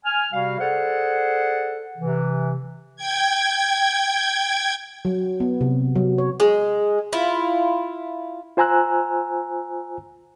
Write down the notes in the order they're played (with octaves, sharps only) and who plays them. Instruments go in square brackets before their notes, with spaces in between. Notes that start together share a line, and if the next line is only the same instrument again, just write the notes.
[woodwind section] G#5 F6
C3 G3 F#4 F5
G#4 A4 C5 D5 F#5
C3 E3
[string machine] G5 G#6
[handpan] F#3
B3
C3
F#3
C#5
[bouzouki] G#3
E4 F4
[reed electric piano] F4 C5 G#5 A#5 E6 F#6